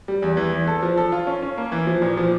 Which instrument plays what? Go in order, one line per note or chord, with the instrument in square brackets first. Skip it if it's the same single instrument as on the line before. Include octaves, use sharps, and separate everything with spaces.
[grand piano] G3
E2
E3
E2
A4
F3
A4
F4
C#4
C#4
A#3
E3
F3
A#2
F3